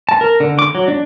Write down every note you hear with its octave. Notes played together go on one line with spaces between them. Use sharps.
A5
A#4
D3
D6
F#3
D4